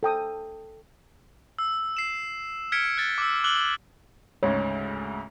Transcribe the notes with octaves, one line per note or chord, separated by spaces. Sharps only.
A4 G5 D#6
E6
C7 E7
F6 G#6 B6 C#7 D7
F#6 A6
D6 E6
D6 E6 F#6 F#7 G7
D2 G#2 C#3 C#5